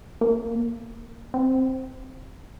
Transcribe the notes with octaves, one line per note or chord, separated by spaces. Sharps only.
A#3
C4